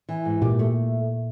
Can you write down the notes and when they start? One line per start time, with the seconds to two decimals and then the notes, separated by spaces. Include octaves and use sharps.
0.09 E3
0.25 G#2
0.42 A#2 G4
0.59 A3